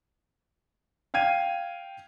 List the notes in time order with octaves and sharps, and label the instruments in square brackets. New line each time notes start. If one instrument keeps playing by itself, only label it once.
[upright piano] F5 G5 G#6 D#7